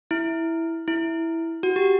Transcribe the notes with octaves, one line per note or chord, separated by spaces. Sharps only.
E4
E4
F#4
G4